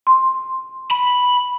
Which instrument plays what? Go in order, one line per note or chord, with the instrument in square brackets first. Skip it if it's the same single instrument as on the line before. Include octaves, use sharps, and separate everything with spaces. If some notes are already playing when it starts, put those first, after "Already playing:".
[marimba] C6
[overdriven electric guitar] B5